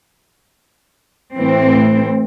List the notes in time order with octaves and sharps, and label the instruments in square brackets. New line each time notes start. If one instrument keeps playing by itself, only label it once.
[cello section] A2 E3 C4